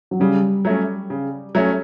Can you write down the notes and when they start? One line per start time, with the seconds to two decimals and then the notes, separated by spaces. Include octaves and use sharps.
0.11 F#3
0.20 C#3 G3
0.65 F#3 A3 C#4
1.10 C#3
1.55 F#3 A3 C#4